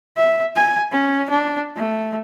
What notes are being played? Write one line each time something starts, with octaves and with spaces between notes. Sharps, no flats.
E5
G#5
C#4
D4
A3